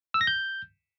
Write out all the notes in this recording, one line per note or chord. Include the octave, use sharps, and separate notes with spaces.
E6
A#6
G6